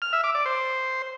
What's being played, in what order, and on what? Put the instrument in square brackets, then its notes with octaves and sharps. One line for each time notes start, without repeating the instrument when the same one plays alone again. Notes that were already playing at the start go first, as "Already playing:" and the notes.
[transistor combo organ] F6
E5
D6
D5
C5